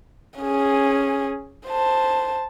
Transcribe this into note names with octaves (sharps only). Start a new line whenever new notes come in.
C#4 G#4
C5 A5